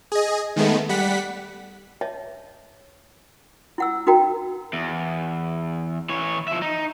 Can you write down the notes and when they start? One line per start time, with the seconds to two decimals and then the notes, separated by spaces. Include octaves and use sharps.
0.12 G#4 D#5
0.56 D#3 G#3 A3 B3
0.89 G3 F#5 B6
2.01 C#5 D#5 E5 A5
3.78 E4 F#5 E6
4.07 D#4 F#4 A#4 G5 A#5
4.73 E2
6.10 E3 C#5
6.48 F3 E5
6.62 D#4